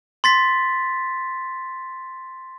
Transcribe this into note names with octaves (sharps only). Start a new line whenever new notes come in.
C6 A6 B6